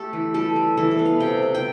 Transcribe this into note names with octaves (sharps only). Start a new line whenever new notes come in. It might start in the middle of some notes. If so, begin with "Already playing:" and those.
Already playing: A3 G4 A4
E3
G3 A4
G3
E3 A4
A4
B3
F5
C3 G5
C3
G5